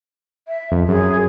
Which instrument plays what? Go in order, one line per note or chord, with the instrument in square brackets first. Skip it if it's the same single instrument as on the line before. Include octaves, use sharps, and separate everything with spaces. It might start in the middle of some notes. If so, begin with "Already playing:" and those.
[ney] E5
[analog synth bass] F2
[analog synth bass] F#2 [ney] G#4